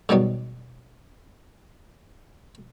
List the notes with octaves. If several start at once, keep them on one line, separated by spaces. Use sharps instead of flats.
G#2 B2 D#3 F#3 G3 B3